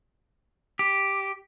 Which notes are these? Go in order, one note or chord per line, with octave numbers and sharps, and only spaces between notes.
G4